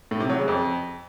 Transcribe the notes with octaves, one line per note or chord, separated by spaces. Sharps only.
A2
C3
F#3
C#3
F2